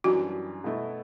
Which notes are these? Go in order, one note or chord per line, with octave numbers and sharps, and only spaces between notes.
F#2 E3 G3 D4 F#4
B2 A3 E4